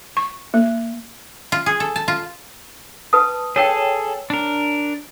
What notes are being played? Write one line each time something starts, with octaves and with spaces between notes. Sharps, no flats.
C#6
A#3
F4
G#4
A4
A5
F4
B4 A5 D#6
G#4 A4 C#5 G5
D4 A#4